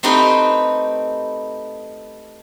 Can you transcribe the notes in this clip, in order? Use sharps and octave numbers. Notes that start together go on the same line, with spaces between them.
A3 C4 D#4 G4 B4 D#5